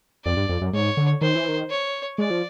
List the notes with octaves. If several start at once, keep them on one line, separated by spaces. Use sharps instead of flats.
F2 D5
G2
F2
F#2
G#2 C#5
D3
D#3 C5
E3
D#3
C#5
G#3 D5
F3